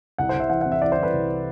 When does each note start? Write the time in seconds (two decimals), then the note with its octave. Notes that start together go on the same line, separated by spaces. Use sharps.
0.18 C2 F#5
0.29 C5
0.34 C2
0.40 E5
0.50 E3 F#5
0.61 C3 F#5
0.72 E5
0.82 E3 D5
0.92 C5
0.98 C2
1.03 B4
1.13 C2